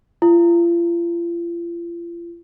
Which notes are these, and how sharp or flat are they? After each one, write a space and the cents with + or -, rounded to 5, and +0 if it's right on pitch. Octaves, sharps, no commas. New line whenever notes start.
F4 -40